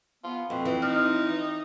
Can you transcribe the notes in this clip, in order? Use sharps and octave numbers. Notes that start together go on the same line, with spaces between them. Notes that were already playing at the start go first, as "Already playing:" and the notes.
B3 F4
F2 B2 C4
E3
D#4 F6